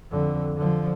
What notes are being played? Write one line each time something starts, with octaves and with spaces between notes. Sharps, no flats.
F2 D3
D3 F3